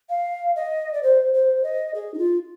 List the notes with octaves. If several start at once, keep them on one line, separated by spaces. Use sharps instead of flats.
F5
D#5
D5
C5
C5
D#5
G#4
D#4
F4